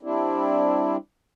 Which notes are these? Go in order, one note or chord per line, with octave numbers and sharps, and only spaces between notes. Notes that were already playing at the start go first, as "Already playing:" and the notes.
G3 C4 D4 E4